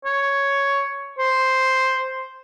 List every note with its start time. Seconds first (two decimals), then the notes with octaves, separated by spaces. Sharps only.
0.05 C#5
1.18 C5